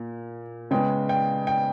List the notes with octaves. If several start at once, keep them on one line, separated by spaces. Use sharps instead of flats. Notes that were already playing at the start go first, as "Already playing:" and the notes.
Already playing: A#2
C#3 G#3 B3 G5
G5
G5